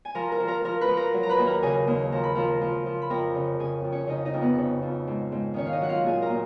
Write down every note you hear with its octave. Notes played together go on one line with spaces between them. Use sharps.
G#5
F3 A#4 A#5
A#4 A#5
F3
A#4 A#5
F3 A#4 A#5
B4 B5
F3
A#4 A#5
F#3
A#5
B4 B5
D#2
A#4 A#5
C#3 G#4 G#5
D#2
F3 A#5
B5
F3 A#4 A#5
F3
F3
B5
F2 A#4 A#5
C#3
C#3 G#4 G#5
F2
C#4 C#5
C#3 D#4 D#5
D#4 D#5
F2
B3 B4
C#3
F2
G#2
G#2
D#3 C#4 C#5
F5
D#4 D#5
F#3 F#5
F4 F5
A#2 G#4 G#5
A#4 A#5
A#2